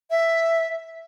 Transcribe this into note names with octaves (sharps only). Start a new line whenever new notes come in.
E5